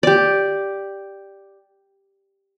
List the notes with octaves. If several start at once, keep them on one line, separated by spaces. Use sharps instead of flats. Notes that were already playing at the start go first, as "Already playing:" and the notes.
G4 D5